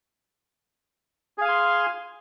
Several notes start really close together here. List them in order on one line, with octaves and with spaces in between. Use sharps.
G#4 F5 G#5 C6